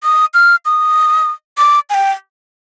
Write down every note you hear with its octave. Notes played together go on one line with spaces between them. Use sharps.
D#6
F6
D#6
D6
G#5
G5